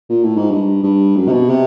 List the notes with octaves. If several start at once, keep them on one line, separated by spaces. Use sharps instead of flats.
A#2
A2
G#2
G2
G2
F#2
C3
B2
C3